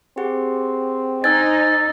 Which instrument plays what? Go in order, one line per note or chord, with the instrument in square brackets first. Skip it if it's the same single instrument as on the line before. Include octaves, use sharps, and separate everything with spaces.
[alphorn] C4 [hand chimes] G4 G#4 F#5
[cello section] D#4 [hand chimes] C5 G#5 G#6 [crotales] E6 A6